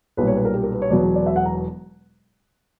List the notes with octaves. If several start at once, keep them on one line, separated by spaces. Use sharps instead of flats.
B1 A#2 G3 B4
C#5
B4
A#4
G4
A#4
B4
C#5
E1 E2 B2 F#3 B3 D5
D5
E5
F#5
A#5